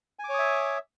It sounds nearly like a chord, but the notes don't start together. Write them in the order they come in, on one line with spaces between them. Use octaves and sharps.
G#5 D6 C#5 D#6 E5